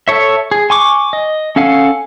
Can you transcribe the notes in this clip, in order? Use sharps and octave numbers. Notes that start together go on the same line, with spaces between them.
A4 C#5 E5
G#4
G#5 C#6 D6
D#5
C#4 A4 F5 F#5 G#5